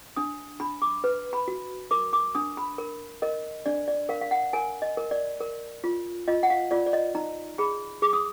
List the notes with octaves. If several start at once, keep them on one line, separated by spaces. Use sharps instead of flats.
D4 D#6
D4 B5
D6
B4
B5
F#4
A#4 D6
D6
D4 D#6
B5
A#4
A#4 D#5
D4 D5
D5
A#4 F5
F5
F#5
A#4 G#5
D#5
A#4
D5
A#4
F4
F4 D#5
F#5
F5
F4 D5
D5
D#5
D#4 A#5
G#4 B5
G#4 D6
D#6